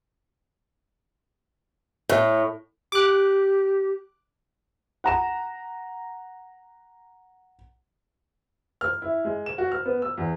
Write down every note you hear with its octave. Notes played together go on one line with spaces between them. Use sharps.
A2
G4 D6 F#6
F#5 A#5 E7
F6
E4
G#3
E7
F#4
F6
B3
E6
E2